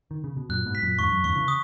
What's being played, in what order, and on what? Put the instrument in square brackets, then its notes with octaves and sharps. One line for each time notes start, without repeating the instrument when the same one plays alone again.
[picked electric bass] D#3
C#3
B2
[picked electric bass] F#2 A#2 [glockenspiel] F#6
[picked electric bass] G#2 B2
[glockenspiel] B6
[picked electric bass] F#2 A#2
[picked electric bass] E2 G#2 [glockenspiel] C#6
[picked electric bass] F#2
[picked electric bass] E2 G#2 [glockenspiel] C#6
[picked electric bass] C#3 E3
[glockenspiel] D#6